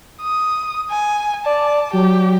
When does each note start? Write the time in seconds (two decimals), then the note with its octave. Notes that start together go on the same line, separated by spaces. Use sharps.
0.21 D#6
0.90 G#5
1.46 D5 A5
1.93 F#3 G4